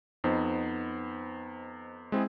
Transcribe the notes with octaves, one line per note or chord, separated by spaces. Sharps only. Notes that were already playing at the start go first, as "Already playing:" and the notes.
F2 B3 D#4 C5
G#3 C4 E4 G#4